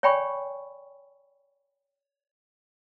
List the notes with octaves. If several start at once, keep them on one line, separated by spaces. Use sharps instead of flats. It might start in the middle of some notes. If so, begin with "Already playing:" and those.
C#5 D5 G5 G#5 B5 C#6